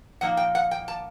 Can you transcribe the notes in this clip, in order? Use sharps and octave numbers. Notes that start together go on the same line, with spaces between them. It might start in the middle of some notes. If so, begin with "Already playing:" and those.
A#2 F3 A#3 D#4 F#5
G5
F#5
G5
A5